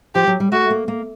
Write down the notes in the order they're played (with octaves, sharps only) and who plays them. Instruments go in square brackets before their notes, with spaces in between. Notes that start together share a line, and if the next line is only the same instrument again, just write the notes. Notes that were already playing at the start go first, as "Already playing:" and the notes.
[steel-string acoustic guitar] F3 [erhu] G4
[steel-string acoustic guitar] F#3
G3
[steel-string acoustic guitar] A3 [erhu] F#4
[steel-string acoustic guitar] A#3
A#3